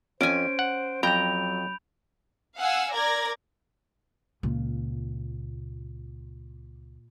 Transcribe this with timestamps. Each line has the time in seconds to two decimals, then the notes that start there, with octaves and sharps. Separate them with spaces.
0.21 F2 C#4 C5 G#5 D7
0.59 F#5
1.03 F2 F#3 G5 A#5 B5 G6 F7
2.59 F5 F#5 G#5 E6
2.93 A#4 D5 G#6 A#6
4.43 C#2 A#2